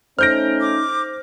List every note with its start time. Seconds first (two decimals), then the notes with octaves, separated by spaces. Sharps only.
0.19 A3 C#4 D#4 C5 F6 G6 A#6 D7
0.61 D6